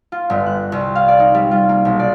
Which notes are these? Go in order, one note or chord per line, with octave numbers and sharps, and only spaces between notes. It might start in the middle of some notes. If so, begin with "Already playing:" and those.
F4
G1
F#6
C2
F5
D5
D#4
G3
F4
A#3
B1
D5